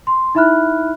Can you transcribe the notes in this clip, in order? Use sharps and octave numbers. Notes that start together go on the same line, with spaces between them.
C6
D#4 E4 E5 B5 F6 F#6